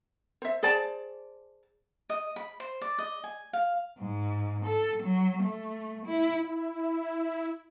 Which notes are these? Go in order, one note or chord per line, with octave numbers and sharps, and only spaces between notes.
C5 E5
G#4 C5 D5 A5
D#5
B5
C5
D5
D#5
G#5
F5
G#2
A4
F#3
A3
E4
E4